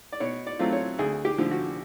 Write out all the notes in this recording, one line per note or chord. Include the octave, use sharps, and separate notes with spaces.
D5
B2 C#5
D5
F#3 A3 C4 F4
C#5
D2 G#4
G4
D3 F3
F#4